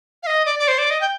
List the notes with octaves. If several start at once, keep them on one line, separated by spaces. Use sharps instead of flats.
F5
D#5
D5
D5
C5
D5
D#5
G5